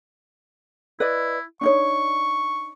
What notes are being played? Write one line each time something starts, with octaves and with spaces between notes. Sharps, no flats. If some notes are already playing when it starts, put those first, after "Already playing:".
E4 B4 D5 D#5
D4 D#4 C#5 C#6